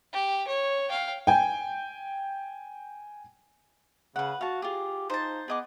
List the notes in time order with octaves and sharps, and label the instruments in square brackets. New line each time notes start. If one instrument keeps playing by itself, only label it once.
[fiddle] G4
C#5
F5 G5
[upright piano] G5 G#5
[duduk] C#3 [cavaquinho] B4 F#5
[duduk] F#4 [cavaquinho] F5 A5
[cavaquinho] F4 G#4 [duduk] G4
[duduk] D#4 [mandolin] C5 A5
[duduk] B3 [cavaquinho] G#4 D#5 D6